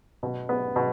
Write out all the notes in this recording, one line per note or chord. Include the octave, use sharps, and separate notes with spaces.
B2
B3
B2